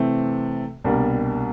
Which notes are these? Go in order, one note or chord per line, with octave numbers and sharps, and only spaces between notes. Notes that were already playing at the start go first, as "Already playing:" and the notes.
Already playing: C3 E3 A3 C4
C2 B2 G3 A#3 D4